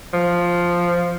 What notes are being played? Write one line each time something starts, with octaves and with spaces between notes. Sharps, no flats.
F3